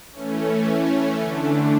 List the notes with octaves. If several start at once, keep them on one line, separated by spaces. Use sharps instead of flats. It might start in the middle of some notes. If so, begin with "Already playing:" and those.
E3 A3 C#4
D3 A3 D4